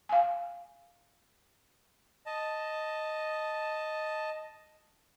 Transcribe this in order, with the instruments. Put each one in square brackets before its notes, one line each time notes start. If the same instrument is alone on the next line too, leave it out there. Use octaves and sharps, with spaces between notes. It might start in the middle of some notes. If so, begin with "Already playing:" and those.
[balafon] F5 G#5
[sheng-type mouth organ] D#5 A5